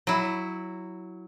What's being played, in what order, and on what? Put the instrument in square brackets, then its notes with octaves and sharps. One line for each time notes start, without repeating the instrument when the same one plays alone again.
[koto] F#3 E4